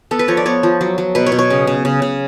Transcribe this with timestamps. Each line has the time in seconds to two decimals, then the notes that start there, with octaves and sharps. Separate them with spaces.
0.11 B3 A4
0.19 B4
0.28 F3 C#5
0.37 D5
0.46 B3 C#5
0.63 F3
0.81 F#3
0.98 F#3
1.15 B2 B4
1.26 C#5
1.32 B2
1.39 C#5
1.50 C#3
1.67 C#3
1.85 C#3
2.02 C#3